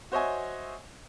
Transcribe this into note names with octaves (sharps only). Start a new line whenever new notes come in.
F#4 C5 C#5 D#5 E5 G#5